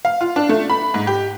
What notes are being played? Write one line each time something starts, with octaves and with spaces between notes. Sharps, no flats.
F5
F4
D4
A3
B5
G#2
G4